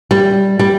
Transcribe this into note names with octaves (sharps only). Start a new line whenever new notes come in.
G3
G3